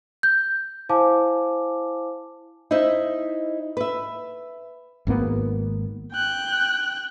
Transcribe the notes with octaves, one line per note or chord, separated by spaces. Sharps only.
G6
E4 C5 F5 G#5 A5 D6
D#4 E4 C5 D#5 E5
B4 E5
G#1 G#2 A#3 B3
G5 F#6